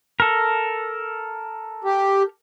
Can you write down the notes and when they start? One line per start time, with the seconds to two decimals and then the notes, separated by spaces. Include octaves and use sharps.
0.20 A4 A#4
1.84 G4